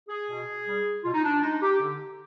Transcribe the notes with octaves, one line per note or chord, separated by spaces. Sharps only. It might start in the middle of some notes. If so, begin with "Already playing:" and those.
G#4
B2
G3
B2 F4
D#4
D4
G#3 D#4
G4
D3